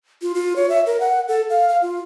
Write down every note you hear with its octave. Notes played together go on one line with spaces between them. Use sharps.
F4
F4
C#5
E5
A#4
F#5
A4
F5
F5
F4